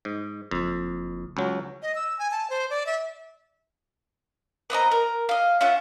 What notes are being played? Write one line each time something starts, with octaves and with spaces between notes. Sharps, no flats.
G#2
F#1 F2
C#2 F#3
D#5
E6
G#5
A5
C5
D5
E5
B3 C4 D#5 A#5
A#4
D#5 F5
C#4 F4 E5 F#5